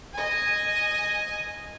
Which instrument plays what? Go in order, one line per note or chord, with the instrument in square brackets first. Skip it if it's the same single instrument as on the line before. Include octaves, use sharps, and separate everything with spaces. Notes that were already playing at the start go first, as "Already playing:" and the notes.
[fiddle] D#5 G#5